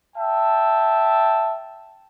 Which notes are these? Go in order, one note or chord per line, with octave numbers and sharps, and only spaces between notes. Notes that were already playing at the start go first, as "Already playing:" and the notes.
E5 G5 A5